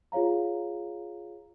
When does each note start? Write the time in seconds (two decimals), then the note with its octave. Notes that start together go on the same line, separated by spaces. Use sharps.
0.12 F4 G#4 C#5 F5 A#5